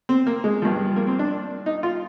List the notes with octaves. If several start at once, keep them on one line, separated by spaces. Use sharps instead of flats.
C4
A#3
G#3
G2 F3
A#3
C4
D4
D#4
F4